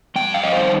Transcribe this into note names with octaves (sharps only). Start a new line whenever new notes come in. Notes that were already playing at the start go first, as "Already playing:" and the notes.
G2 G5
F5
D#5
D#3 G3 C5